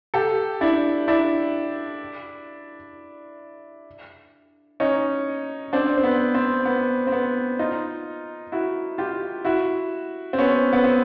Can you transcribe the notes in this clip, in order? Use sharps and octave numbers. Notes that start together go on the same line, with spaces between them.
G4 A4
D4 E4
D4 E4
C#4 D#4
C4 D4
C4
B3
C4
B3
C4
B3
D#4 F4
E4 F#4
F4 G4
E4 F#4
C4
B3 C#4
B3
C4